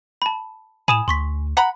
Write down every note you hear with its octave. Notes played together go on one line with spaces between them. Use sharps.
A5 B5
A2 G#5 B5 D#6 E7
D2 C6 C#6 B6
F#5 A#5 B5